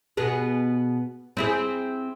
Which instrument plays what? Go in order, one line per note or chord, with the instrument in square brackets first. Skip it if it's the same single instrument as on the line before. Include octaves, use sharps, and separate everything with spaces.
[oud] B2 B3 G#4
C4 E4 G#4